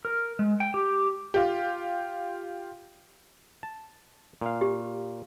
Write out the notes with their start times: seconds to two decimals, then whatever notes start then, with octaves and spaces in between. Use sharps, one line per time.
0.05 A#4
0.39 G#3
0.60 G5
0.74 G4
1.34 F4 G4
3.63 A5
4.41 A#2 F5
4.61 G4